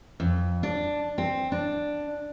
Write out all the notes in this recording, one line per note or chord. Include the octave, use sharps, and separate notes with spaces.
F2
D4
C4
D4